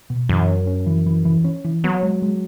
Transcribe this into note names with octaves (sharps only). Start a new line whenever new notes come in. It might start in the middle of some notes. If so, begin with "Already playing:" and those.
B2
F#2 E3
C#4
C#4
E3
E3
E3
C#4
E3
F#3 B3
G#3
G#3